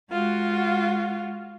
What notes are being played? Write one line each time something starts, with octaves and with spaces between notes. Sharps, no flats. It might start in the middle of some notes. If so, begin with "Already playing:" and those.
G#3 F4 F#4